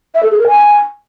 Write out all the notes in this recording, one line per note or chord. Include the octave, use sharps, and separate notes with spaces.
E5
A4
G#4
A#4
G#5